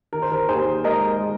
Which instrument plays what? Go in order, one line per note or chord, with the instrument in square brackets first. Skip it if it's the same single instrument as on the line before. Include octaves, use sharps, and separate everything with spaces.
[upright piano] D#3 A#4
C5
A#4
D#2 G#4 C5
G#3 A#4 D#5
G#3